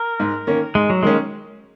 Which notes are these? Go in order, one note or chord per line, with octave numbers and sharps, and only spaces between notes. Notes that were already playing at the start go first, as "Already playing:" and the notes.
Already playing: A#4
G#2
D#3 A#3 C#4
G#2 G#3
F#3
D#3 G#3 A#3 C#4